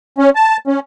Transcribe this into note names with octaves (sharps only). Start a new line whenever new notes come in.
C#4
A5
C#4